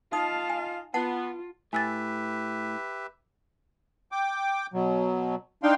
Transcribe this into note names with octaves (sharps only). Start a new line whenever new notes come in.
D#4 F4 D#5 F5 A5 D#6
G#5
B3 F4 F#5 A5
A2 G4 B4 E5 G#5 E6 A6
G5 D6
B2 F#3
D4 D#4 F5 G5 C6